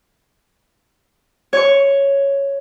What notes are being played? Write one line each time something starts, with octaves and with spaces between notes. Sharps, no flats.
C#5 C#6